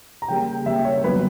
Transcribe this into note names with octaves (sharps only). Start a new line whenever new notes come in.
A#5
C#3 G3 A#3 G5
C#3 G3 A#3 E5
C#5
G2 D3 F#3 B3 B4